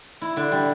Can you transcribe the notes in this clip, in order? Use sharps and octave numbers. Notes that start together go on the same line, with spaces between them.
E4
D3
G3